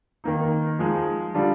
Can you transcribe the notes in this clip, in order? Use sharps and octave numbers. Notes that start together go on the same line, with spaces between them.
D#3 A#3 D#4
F3 G#3 D#4
D3 G3 D4 F4